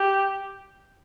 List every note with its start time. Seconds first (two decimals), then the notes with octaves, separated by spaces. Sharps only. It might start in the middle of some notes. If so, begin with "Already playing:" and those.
Already playing: G4